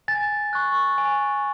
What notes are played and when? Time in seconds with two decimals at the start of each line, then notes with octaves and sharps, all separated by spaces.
0.08 G#5 A6
0.53 C#6 F#6
0.98 G#5